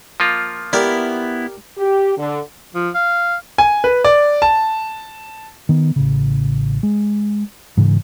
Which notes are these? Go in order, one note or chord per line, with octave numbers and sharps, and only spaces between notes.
F3 A#3 F4
B3 E4 G4 A#4 D5
G4
D3
F3
F5
G#5
B4
D5
A5
D#3 B3
A1 C#3
G#3
G#2 C#3 E3